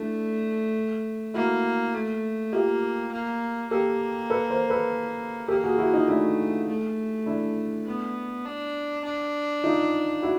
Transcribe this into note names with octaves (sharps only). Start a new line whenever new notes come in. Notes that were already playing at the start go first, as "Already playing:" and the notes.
Already playing: A3 D4 E4
A#3 E4 F#4
A3
A#3 F4 G4
A#3
A#3 G4 A4
A4 B4
A#4 C5
A4 B4
A#3 G4 A4
F#4 G#4
E4 F#4
D#4 F4
A3 D4 E4
A3
D4 E4
B3
D4
D4
D#4 F4
E4 F#4